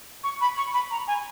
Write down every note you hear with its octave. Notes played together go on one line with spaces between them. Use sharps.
C#6
B5
C#6
B5
A#5
G#5